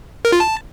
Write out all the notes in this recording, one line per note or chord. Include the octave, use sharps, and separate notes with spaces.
A#4
F4
A5